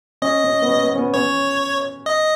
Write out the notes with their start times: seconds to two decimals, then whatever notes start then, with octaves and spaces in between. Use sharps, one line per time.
0.22 C#4 D#5
0.44 C#4
0.62 B3
0.68 C#4
0.83 B3
0.95 C#4
0.98 B3
1.14 C#4 C#5
2.06 D#5